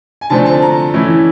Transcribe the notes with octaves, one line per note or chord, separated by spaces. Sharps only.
G#5
D3 F3 A3 C4 A5
A5
A#5
E3 A3 C#4 E4